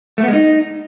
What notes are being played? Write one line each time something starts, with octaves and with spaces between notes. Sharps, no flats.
A3
B3
G#3
D#4